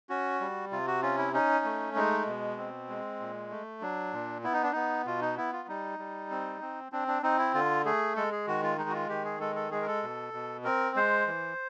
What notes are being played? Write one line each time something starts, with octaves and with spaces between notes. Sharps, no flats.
C#4 F#4
G3
C3 F4
F#4
C#4 F4
E4
C#4 D#4
A3
G#3 D#4
B2
C4
G#3
A#2
A3
F#3 D4
A#2
B3 E4
D#4
D4
B3 D#4
B2 F4
D#4
B3 E4
F4
G3 D#4
G3
C4
C4
C4 D4
D4
C4 D#4
E4
D3 F4
A3 G#4
G#3 A4
G#4
D#3 F#4
F4
G#3 D#4
F#4
F4
D#3 G4
G#4
G#3 A4
A4
G#3 G#4
A#4
A4
B2
B2
C4 A#4
G#3 C5
E3